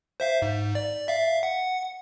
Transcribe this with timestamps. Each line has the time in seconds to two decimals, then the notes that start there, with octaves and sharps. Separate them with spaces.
0.20 C5 E5 F5
0.42 G#2
0.75 D5
1.08 E5 F5
1.43 F#5